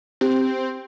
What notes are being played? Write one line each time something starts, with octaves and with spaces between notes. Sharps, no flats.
C4 G4